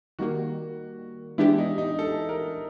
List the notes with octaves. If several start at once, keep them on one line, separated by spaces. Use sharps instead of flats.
D#3 G3 A#3 F#4
E3 G#3 B3 D4 E4 G4
D#4
D#4
A4
A#4